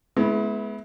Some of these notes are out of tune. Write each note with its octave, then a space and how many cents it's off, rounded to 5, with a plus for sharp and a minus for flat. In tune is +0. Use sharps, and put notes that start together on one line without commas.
G#3 +35 B3 +0 E4 -10